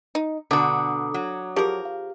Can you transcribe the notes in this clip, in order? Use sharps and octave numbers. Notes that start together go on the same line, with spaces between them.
D#4
B2 D3 D4 F#4 A#5 D6 D#6
F#3
F3 G4 G#4 A#4
F5